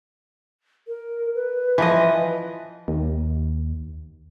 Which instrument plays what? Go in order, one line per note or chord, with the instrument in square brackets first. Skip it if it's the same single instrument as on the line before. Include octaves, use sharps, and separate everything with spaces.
[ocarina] A#4
B4
[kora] E3 F3 D#5
[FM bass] D#2